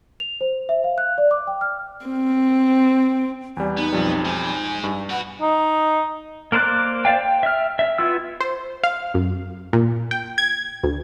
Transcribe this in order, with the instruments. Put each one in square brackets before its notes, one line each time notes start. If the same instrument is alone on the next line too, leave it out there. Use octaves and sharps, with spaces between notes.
[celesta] F7
C5
E5
F5
F#6
D5
D6
G5
F6
[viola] C4
[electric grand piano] E2 G3 [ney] G#5
[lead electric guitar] B3 [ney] D#4
[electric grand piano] B1 F2 G3
[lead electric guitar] G#3 D#4 [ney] G#5
[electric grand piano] G2
[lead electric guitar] F#4 B4 [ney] F#5
[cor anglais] D#4
[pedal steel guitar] A#3 A#4 C5 D5 F#6
C5 D5 F5 G5
G5
E5 F6
E5
B3 E4 F4 E6
[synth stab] C5
F5
F#2
A#2
G5
G#6
D2